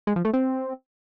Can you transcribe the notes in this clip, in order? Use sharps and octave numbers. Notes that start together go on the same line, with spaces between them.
G#3
F3
A3
C4